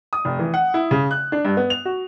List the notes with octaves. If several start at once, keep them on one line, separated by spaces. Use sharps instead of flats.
D#6
F1
E3
F#5
E4
C#3
F#6
D4
G2
B3
F7
F#4